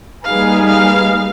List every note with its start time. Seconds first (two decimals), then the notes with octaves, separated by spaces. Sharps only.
0.24 G3 A#3 D#4 G#4 B4 F5
0.66 F5